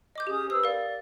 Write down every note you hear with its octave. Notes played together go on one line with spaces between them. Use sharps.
D#5 D6 G6
C#4 G4 G#4 D#6
B4 C5 D#6 E6
A#4 D5 F5